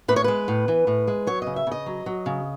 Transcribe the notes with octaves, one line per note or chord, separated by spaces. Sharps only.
A2 B4
C#5
G#3 B4
A2
E3
A2
G#3
F#3 C#5
C#3 D#5
E5
C#3 D#5
F#3
F#3
C#3